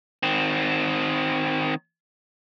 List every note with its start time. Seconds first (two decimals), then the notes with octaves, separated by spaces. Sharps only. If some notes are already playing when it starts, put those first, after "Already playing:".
0.23 D#3 C4